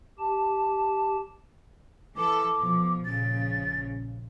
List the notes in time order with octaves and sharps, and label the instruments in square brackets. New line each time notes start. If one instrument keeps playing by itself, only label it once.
[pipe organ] G4 A5
[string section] E3 A4 [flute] D6
[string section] B2 F3
[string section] A#1 C#3 [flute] A6